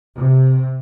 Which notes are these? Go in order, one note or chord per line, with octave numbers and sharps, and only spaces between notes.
C3